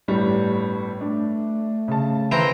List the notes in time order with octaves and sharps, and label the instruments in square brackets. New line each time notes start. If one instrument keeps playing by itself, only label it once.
[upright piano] G1 A2 G3
[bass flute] A3 [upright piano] D4
[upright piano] C#3 A5
[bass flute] D#3 [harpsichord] E3 C4 A#5